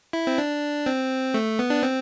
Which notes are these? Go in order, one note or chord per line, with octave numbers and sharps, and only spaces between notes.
E4
C4
D4
C4
A3
B3
D4
C4